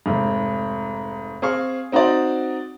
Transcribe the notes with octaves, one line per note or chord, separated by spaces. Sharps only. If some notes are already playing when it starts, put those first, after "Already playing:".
F1 G#2
C4 G#4 F5 C#6
C4 D#4 F#4 C5 D5